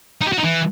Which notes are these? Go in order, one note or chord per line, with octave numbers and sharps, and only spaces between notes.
D#4
G4
F#4
D#4
E3